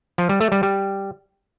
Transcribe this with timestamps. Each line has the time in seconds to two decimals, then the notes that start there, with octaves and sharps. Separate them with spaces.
0.18 F3
0.29 G3
0.41 A3
0.52 G3
0.63 G3